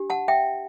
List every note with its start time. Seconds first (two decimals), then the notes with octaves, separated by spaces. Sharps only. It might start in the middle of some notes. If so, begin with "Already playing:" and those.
Already playing: D4 G4
0.10 F#5 A5
0.28 E5 G5